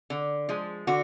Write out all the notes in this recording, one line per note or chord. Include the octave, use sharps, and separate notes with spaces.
D3
F3 G#3
D3 F#4